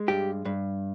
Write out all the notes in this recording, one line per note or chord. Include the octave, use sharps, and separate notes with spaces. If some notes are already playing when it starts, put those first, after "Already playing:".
Already playing: G#3
G2 G4
G2